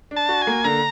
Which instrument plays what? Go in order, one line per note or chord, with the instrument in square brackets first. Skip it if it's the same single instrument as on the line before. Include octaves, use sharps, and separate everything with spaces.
[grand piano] D4
[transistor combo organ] A5
[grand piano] F#4
[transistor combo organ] G#5
[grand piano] A#3
[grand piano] D3 [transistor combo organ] A#5